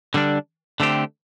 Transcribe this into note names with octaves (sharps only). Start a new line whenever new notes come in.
D3 G3 D4
D3 A3 C4 G4